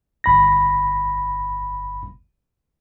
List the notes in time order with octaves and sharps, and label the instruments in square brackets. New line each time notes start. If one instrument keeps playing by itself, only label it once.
[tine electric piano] G1 B5 A#6